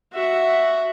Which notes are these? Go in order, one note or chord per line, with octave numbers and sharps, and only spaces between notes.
F#4 E5